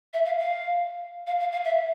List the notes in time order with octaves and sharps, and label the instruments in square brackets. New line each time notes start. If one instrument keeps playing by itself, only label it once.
[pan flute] E5
F5
F5
F5
F5
F5
E5